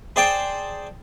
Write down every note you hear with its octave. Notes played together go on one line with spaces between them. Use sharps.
G#4 C5 D5 G5 A5 D6